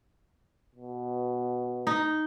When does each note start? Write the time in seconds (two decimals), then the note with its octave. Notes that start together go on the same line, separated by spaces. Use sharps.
0.75 B2
1.87 D#4